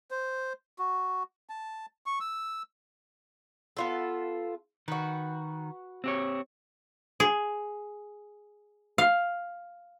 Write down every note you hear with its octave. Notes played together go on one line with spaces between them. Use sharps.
C5
F#4
A5
C#6
E6
B3 F4 A4
D#3 F#4 B4
C4 G4 C#5
G#4
F5